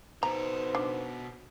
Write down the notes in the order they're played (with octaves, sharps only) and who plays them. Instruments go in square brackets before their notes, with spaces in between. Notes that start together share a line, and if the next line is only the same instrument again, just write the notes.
[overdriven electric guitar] B2 A4 [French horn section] D#4 B4 C5 [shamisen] A#5
[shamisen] D4